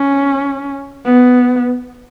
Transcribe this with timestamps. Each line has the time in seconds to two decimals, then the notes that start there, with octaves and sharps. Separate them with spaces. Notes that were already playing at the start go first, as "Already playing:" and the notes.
Already playing: C#4
1.05 B3